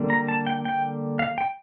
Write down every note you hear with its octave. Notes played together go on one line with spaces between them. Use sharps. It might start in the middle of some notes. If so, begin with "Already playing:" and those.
Already playing: D3 G3 A#3
A#5
A5
G5
G5
F5
G5